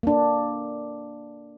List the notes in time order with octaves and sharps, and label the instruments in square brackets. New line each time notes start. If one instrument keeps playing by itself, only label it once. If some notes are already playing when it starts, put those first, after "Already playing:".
[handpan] A#3 D4